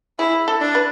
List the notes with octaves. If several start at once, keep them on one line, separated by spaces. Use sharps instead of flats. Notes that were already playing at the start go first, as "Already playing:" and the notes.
E4 G#4
A4
D4
B4